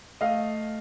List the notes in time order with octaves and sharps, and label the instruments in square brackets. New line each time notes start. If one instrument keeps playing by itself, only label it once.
[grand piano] A3 D#5 F5